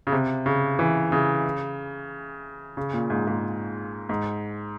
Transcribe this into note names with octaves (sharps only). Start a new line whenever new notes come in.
C#3
C3
C#3
E3
C#3
C#3
A#2
G#2
G#2
G#2